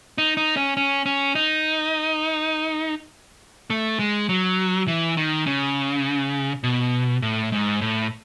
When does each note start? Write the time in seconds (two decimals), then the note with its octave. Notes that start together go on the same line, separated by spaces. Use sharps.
0.18 D#4
0.37 D#4
0.57 C#4
0.77 C#4
1.06 C#4
1.35 D#4
3.70 A3
3.99 G#3
4.29 F#3
4.87 E3
5.17 D#3
5.46 C#3
6.63 B2
7.22 A2
7.52 G#2
7.81 A2